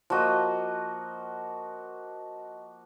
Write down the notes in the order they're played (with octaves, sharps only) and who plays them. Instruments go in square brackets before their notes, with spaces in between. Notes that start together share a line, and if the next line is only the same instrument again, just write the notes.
[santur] F3 A#3 F#4 D#5